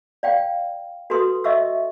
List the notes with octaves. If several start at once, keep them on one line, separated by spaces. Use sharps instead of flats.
D5 F5 G5
F#4 A4 B4 C6 D#6
D#5 E5 C#6 E6